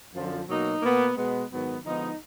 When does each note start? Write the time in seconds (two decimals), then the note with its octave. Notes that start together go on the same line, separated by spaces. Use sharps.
0.14 F#2 D3 F3
0.49 B2 F#3 A#3 D#4
0.82 B2 A#3 B3
1.17 B2 G#3 B3
1.51 G#2 D#3 F#3 B3
1.84 D3 F3 G#3 B3 D#4